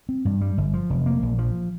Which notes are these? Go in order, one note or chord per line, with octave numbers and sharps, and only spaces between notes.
C4
G2
G3
G1
F3
F1
A#3
A#1
F3